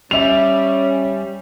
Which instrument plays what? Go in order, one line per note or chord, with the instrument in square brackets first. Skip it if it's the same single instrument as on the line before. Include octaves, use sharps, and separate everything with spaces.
[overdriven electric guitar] G3 [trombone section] C#4 [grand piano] E5 F7